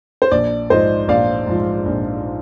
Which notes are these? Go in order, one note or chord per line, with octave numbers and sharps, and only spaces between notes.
C5
A#1 D5
G#2 F3 C5 D#5
A#1 D5 F5
G#2 F3
A#1